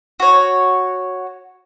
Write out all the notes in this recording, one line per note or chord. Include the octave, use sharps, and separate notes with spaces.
F#4 C#5